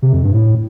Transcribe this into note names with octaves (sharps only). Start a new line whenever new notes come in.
C3
F2
G2
A2